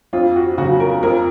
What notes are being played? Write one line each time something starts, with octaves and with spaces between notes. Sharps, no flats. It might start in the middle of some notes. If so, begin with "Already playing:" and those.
F2 F4
F#4
C#3 F#3 F#4
A#4
F2 A#4